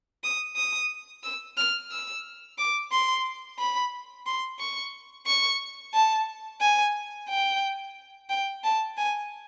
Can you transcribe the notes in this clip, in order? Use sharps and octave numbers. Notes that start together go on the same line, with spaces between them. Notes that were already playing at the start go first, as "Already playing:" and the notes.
D#6
D#6
E6
F6
E6
D6
C6
B5
C6
C#6
C#6
A5
G#5
G5
G5
A5
G#5